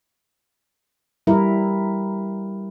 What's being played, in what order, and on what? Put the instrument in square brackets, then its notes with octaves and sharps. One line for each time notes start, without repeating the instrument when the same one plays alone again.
[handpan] G3 E4 A#4